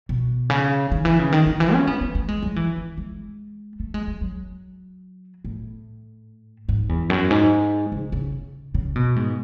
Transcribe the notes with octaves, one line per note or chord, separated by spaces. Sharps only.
B2
C#3
D#3
E3
C#3
D#3
D#3
E3
C#4
B3
B3
A3
G#3
F#3
E3
E3
G#3
A3
G#3
G#3
F#3
A2
G#2
E2
F#2
G#2
C#3
C#3
C#3
B2
G#2